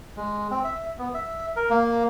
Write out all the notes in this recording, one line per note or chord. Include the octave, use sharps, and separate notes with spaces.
G#3
C4
E5
B3
E5
A#4
A#3